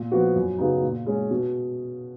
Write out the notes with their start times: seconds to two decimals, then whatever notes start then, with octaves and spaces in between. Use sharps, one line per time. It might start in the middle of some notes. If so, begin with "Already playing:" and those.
Already playing: A#2
0.11 F3 B3 F#4
0.36 F#2
0.58 C#3 F#3 B3 D#4
0.82 A#2
1.06 G#3 C#4
1.31 B2